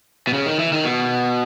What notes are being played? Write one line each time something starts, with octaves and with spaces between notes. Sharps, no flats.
B2
C#3
D#3
E3
D#3
B2